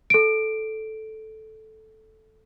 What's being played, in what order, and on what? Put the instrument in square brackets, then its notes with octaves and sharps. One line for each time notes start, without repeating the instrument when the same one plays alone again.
[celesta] A4 D7